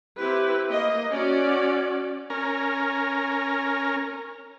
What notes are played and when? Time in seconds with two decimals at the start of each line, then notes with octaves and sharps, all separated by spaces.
0.17 C4 E4 G4 B4
0.71 A#3 D#5
1.11 C#4 F#4 D5
2.30 C#4 A#4